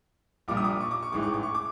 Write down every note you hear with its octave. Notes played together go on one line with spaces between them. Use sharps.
A#1 A#2 G3 A#3 D6
D#6
D6
C#6
D6
C#6
A1 G#2 E3 G#3 D6
C#6
D6
C#6
D6